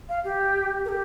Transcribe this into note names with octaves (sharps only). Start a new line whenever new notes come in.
F5
G4
A#4
G4